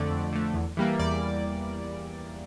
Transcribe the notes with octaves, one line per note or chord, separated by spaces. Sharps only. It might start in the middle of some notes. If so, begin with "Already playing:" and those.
Already playing: F2 D3 A3 D5
F2
D3 A3
E2
E3 G3 A#3
E2 D5